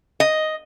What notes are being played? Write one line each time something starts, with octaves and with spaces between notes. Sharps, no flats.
D#5